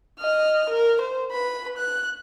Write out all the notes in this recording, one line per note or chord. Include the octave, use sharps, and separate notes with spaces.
D#5 F6
A#4
C5
B4 B5
F#6